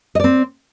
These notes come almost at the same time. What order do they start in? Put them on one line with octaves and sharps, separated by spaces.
D#5 D5 C4